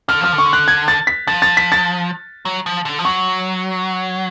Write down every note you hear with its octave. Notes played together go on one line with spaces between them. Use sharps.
D3 F6
F3 F6
D3
C#6
F#6
G#6
A6
B6
F3 A6
A6
B6
A6
F#3
F3
D3
F3
F#3 C#6